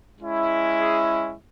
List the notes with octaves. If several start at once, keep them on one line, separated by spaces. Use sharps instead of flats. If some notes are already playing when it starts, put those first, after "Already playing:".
G#3 C#4 E4
G#4